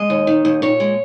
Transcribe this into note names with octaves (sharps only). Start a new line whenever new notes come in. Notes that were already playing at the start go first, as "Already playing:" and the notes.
Already playing: G#3 D#5
D#2
D#3
D#2
A#2 C#5
G#3